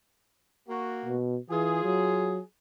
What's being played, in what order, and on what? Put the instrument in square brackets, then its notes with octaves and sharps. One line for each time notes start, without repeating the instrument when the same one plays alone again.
[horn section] A#3 F#4
[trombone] B2
[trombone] E3 [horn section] F4 G#4
[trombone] F#3